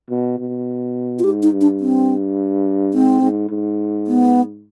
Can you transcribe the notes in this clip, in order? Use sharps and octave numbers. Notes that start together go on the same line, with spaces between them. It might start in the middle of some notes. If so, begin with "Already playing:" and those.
B2
B2
F4
G#2 G4
D#4
G2
D4
C4
G#2 C4
G#2
G#2
B3